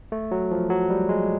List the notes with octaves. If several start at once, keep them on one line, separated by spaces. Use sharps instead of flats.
A3
F#3
F3
F#3
G3
G#3